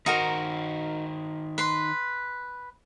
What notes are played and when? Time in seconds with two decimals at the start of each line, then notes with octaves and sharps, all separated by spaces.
0.06 D#3 D#4 F#4 A#4 C5
1.58 B4 C6